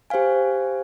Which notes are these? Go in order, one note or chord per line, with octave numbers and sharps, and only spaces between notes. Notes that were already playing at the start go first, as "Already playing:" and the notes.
G4 C5 F5 G#5